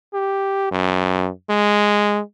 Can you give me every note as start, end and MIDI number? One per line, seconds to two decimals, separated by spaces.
0.14 0.70 67
0.72 1.29 42
1.50 2.21 56